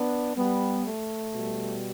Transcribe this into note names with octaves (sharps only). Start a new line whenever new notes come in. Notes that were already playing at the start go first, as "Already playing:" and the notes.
Already playing: B3 D4
G3 B3
A3
B2 G3